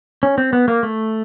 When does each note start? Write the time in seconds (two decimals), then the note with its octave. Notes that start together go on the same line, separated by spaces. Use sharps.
0.23 C#4
0.38 C4
0.53 B3
0.68 A#3
0.83 A3